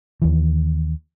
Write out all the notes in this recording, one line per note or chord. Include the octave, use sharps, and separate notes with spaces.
D#2 E3